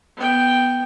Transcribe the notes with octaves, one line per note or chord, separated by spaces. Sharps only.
B3 G5